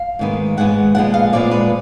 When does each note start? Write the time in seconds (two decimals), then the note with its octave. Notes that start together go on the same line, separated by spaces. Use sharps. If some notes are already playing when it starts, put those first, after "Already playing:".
Already playing: F5
0.19 G#2 D#3 G#3 B3
0.57 G#2 D#3 G#3 B3 F#5
0.95 A#2 F3 G#3 B3 F#5
1.14 F5
1.33 A#2 F3 G#3 B3 D5
1.51 B4